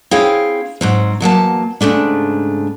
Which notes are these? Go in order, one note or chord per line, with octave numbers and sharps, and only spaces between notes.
C4 E4 G#4 C#5 F5 G5
G#2 F#3 C4
E2 F#3 A#3 A5
G#2 C#3 A3 D4